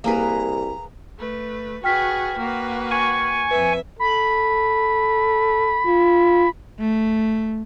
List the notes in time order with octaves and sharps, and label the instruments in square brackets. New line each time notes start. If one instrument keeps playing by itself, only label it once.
[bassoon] C2 [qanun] A#3 G#4 B4 [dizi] A#5
[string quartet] A3 B4
[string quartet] F#4 G#4 B4 [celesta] G5 F6 B6
[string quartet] A#3 F#4 B4
[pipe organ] G#5 C#6
[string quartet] F2 E5 [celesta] B4
[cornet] A4 [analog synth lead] B5
[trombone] F4
[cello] A3